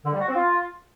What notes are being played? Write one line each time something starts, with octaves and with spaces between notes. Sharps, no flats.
D3
G3
F#4
C4
F4